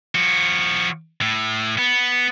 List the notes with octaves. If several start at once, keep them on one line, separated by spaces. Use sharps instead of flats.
F3 F#4
A2
B3